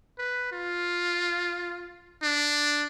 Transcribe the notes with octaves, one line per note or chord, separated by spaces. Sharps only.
B4
F4
D4